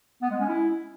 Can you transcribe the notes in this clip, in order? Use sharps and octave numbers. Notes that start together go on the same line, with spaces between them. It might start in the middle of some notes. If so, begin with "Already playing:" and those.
B3
G#3
C#4
E4